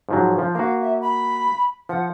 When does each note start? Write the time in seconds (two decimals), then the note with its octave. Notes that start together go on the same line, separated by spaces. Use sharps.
0.09 G#2 F3 F#3
0.39 F3
0.55 A#3 F#4 F5
0.81 E5
1.01 B5
1.89 F3 F#5